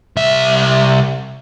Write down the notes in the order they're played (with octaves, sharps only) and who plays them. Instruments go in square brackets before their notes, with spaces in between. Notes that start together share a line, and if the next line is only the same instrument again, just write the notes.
[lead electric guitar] C2 E5